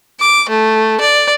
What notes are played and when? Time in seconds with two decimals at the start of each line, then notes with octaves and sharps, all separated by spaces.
0.20 D6
0.49 A3
1.01 D5